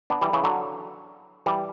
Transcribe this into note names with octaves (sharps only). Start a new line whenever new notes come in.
B3 D4
E3 G3
C#3 E3
D3 F#3
E3 G3